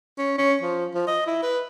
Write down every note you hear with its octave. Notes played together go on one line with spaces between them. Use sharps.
C#4
C#4
F3
F3
D#5
E4
B4